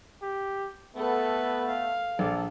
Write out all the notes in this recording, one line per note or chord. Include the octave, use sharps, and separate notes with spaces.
G4
A3 B3 A4 B4
F5
A#1 A4 D5